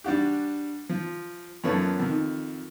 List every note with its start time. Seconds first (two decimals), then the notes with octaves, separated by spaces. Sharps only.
0.04 G3 D4 F#4 G4
0.89 F3
1.64 F#2 F3 A#3 B3 C#4 A4
2.00 F2 D#3